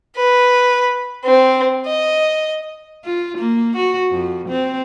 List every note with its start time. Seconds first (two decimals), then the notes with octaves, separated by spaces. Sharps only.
0.16 B4
1.25 C4
1.87 D#5
3.05 F4
3.38 A#3
3.76 F#4
4.11 F2
4.49 C4